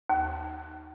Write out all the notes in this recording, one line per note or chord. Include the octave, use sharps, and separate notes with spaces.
D#2